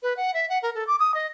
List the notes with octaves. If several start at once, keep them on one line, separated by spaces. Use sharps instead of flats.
B4
F#5
E5
F#5
A#4
A4
D6
D#6
D#5